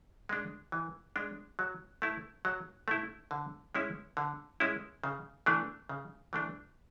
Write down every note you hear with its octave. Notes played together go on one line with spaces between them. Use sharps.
G#3 D4
E3
G#3 D4
F#3
A3 E4
F#3
A3 E4
D3
G#3 C#4 E4
D3
G#3 C#4 E4
C#3
E3 A3 D4
C#3
E3 A3 D4